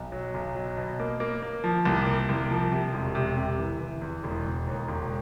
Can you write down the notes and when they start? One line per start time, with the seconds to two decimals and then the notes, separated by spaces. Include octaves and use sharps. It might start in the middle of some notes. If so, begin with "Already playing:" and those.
Already playing: B1
0.12 F#3
0.34 B1
0.55 F#3
0.77 B2
1.00 A#3
1.20 A#3
1.42 A#3
1.64 F3
1.85 C2
2.07 A#3
2.29 C2
2.51 F3
2.72 C3
2.94 E1
3.15 C3
3.37 C3
3.59 E3
3.80 E3
4.02 E2
4.24 E1
4.45 E1
4.67 D#2
4.88 E1